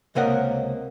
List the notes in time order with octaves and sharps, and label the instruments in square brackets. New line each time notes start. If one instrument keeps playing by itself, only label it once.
[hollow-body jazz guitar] C#2 C3 A#3 D#5 F#5